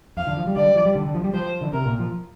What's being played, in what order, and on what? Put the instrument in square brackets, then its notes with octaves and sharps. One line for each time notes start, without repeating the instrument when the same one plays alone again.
[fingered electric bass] F2 [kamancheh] F5
[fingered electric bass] D3
F3
G3
[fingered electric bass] D3 [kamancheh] D5
[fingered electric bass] G3
F3
G3
D3
D3
F3
G3
[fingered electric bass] F3 [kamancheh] C5
[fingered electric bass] D3
[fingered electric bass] C3 [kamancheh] A#4
[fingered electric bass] A#2
F3